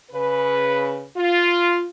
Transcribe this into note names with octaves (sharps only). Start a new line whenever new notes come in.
C#3 B4
F4